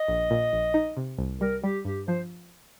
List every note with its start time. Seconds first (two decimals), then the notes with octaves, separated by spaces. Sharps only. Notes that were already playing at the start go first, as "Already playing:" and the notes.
Already playing: D#5
0.08 A#1
0.31 A#2
0.53 A#1
0.74 D#4
0.97 C3
1.19 C2
1.41 G3 A#4
1.63 G3 G4
1.85 G2 G4
2.08 F3 C5